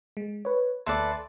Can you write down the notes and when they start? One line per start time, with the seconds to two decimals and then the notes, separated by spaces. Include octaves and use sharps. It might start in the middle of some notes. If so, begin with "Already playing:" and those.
0.17 G#3
0.45 B4 C#5
0.86 D2 A4 B4 D5 E5 C6